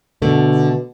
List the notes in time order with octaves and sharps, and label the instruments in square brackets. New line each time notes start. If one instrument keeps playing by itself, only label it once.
[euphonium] B2 [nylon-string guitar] D3 A3